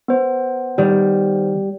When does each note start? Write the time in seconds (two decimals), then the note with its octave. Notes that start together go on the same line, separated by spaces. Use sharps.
0.08 B3 C5
0.78 D#3 G3